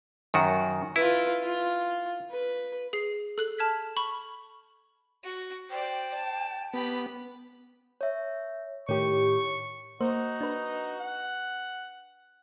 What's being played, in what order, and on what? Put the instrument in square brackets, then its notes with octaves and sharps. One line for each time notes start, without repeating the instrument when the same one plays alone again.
[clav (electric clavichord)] F#2 D#3 F#4
[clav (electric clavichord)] E4 [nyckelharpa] F4 B4
[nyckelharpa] F4
B4
[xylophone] G#4 C7
A4 F#6 F#7
A5 F6 G#6 B6
B5 C#6
[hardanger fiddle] F#4
[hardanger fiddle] C5 D5 [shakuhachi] G5
[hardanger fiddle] A5
[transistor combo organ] B3 [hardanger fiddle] G4 B5
[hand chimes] C#5 E5
[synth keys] A2 D#3 G4 [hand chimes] C#5 [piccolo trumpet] C#6
[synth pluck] A#3 C5 [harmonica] D#4 F#4
[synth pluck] D4 B4
[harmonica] F#5